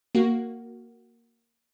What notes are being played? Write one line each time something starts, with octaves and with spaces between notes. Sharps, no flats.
A#3 F#4